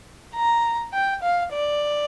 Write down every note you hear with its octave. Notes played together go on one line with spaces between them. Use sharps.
A#5
G5
F5
D5